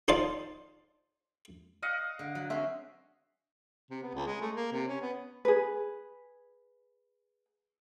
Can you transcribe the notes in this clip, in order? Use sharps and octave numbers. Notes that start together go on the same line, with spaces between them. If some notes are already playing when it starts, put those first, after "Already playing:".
D#4 F4 C5 D5 F5 A5
D#5 F5 F#5
D3
F#3
C4 C#4 C5 E5
C3
B3
C#2
G#3
A3
A#3
C3
C#4
B3
G#4 B4